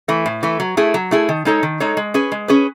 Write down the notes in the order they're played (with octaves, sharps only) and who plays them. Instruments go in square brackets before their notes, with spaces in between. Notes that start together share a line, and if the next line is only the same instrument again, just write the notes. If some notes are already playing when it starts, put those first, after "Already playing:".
[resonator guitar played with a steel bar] E3 A3
A2
E3 A3
F#3
A3 E4 G#4
F#3
A3 E4 G#4
D#3
G#3 D#4 A4 C#5
D#3
G#3 D#4 A4 C#5
G#3
C#4 G#4 B4
G#3
C#4 G#4 B4